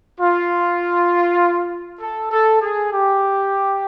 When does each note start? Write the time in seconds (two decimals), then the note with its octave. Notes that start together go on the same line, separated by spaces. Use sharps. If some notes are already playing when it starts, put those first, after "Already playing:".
0.19 F4
2.00 A4
2.31 A4
2.61 G#4
2.91 G4